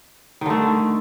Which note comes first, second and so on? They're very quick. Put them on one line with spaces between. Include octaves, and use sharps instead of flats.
D#3 D3 A3